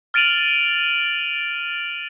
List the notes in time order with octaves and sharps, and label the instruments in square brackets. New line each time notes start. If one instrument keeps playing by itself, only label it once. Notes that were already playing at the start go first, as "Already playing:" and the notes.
[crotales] F6 A6 D7 D#7 F7 F#7